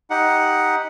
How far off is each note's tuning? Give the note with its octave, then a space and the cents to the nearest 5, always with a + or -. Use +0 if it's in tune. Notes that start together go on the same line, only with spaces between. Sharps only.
D#4 +10 G4 +0 F#5 +0